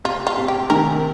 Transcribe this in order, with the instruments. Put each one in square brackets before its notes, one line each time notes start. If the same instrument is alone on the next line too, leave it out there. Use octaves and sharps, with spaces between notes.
[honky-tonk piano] C3 [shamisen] F4
[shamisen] F4
[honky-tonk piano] C3
[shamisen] G4
[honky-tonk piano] D#3 [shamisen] A#4